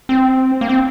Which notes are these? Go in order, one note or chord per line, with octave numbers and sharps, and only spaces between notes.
C4
A#3
C4